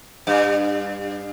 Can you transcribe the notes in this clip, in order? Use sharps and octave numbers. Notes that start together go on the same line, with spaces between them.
G2